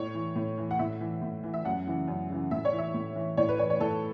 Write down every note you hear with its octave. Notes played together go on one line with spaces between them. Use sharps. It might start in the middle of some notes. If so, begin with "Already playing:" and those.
Already playing: A2 C#5
E3
A2
E3
F#5
A2 E5
E3
A2
E3
E5
F#2 F#5
C#3 E3
F#2
C#3 E3
A2 E5
C#5
E3
E5
A2
E3
A2 C#5
B4
E3 C#5
C#5
A2 A4